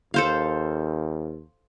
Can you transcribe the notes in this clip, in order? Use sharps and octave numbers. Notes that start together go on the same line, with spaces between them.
D#2 A4 C5 F5